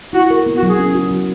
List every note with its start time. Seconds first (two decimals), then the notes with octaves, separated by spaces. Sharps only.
0.13 E4 F#4
0.31 A#4
0.46 B3
0.57 F#4
0.63 F#3 G#4
0.79 C#4
0.95 F#4
1.11 F#3